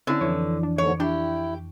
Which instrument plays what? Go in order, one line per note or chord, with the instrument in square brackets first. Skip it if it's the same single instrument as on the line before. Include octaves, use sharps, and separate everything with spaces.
[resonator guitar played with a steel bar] D3 [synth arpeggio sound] C4 C#4 E4
[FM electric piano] F2 E3 [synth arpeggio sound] C#5
[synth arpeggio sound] D4
[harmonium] D#2 G#2 D3 [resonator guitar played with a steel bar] C#5
[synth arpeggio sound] D4 [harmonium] E4 [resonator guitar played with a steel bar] G4